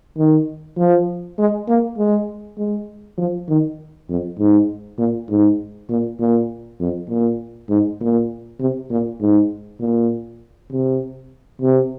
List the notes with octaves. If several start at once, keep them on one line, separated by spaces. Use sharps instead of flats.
D#3
F3
G#3
A#3
G#3
G#3
F3
D#3
F2
G#2
A#2
G#2
A#2
A#2
F2
A#2
G#2
A#2
C3
A#2
G#2
A#2
C3
C3